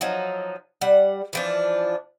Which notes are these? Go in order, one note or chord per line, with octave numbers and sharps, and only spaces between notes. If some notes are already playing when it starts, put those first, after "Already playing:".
F3 F#3 D#4
G3 F#5
E3 F3 D4